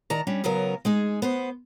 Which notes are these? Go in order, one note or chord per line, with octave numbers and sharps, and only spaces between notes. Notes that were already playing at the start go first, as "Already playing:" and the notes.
D#3 D5 A5 A#5
G3 C#4 D4
C#3 F#3 B3 C#4 A#4
G#3 D#4 G#4
B3 B4 C5